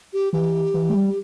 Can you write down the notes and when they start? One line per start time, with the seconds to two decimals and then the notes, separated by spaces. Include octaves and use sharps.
0.13 G4
0.33 E3 G4
0.74 E3
0.90 A3
0.95 G3